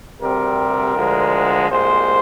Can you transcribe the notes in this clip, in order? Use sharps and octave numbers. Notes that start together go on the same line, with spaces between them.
D2 C3 G3 C4 A#4
D2 D3 F3 G#3
C2 A#2 G#3 C5